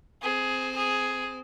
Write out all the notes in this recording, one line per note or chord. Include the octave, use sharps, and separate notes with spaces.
C4 G#4
G#4